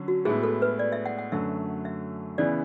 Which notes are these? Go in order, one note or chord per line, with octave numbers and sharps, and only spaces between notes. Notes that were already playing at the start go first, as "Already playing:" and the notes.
Already playing: D3 F#3 C#4
F#4
A2 G#3 B3 E4 G#4
A4
B4
D5
E5
F#5
F#5
F#2 D3 F#3 A3 E5
E5
C#3 E3 B3 D5